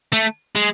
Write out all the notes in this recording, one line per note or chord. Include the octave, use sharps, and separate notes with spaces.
A3
G#3